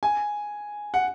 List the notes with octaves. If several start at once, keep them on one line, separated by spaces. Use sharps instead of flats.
G#5
F#5